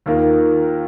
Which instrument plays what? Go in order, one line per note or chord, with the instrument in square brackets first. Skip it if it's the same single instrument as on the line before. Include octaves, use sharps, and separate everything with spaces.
[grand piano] D#2 D#3 A#3 F4 A#4